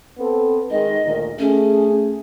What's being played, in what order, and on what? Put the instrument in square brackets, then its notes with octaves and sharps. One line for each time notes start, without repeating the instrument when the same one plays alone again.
[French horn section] B3 C4 A4
[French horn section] D#3 G#3 [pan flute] D#5
[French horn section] D2 A#2 D#3
[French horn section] A3 G#4 [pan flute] C#4